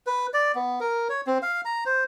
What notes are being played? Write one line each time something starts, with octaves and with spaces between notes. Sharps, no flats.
B4
D5
B3
A#4
C#5
C4
F5
A#5
C5